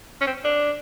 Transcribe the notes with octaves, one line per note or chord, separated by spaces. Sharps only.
C#4
C4
D4